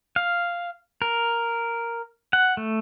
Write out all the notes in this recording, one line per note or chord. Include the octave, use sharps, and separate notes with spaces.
F5
A#4
F#5
A3